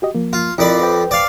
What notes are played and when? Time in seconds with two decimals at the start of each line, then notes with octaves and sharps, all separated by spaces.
0.02 F#4 G4 D#5
0.15 F3 A#3
0.33 F4
0.58 F2 E4 A#4 D5 B5
0.81 B4 C5 G5
1.11 D5 F5